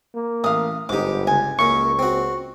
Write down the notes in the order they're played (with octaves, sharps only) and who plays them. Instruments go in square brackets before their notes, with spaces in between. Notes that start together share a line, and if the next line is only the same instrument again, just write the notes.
[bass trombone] A#3
[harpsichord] A1 [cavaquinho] F5 D#6
[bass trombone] G1 [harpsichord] G#2 D#4 [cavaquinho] G4 D6
[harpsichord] C#2 [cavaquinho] G#5
[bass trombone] C#2 [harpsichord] F#2 A#3 [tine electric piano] C#6
[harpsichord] C4 F#4